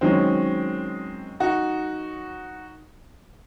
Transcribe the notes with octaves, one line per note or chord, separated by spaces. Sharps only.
D#3 F#3 G#3 C4 C#4
D#4 F#4